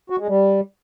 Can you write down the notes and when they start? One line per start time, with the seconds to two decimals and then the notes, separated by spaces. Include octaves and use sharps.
0.10 F#4
0.19 G#3
0.28 G3